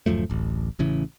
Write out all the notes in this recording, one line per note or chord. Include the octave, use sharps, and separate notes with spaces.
D1 F#2 F3 A3
D1 A1
A1 C#3 E3